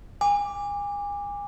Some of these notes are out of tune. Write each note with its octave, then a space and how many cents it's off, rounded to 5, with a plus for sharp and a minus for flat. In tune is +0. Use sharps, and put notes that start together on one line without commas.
G#5 -35 D6 +0